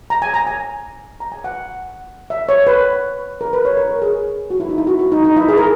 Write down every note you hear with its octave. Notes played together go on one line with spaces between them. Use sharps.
A#5
G#5
A#5
G#5
A#5
G#5
F#5
E5
C#5
B4
A#4
B4
C#5
A#4
A#4
G#4
F#4
E4
D#4
E4
F#4
F#4
D#4
D#4
E4
G#4
A#4